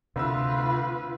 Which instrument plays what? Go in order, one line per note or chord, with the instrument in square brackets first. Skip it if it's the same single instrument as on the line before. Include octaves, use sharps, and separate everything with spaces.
[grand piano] D2 E6 [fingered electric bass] C3 [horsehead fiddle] F4 B4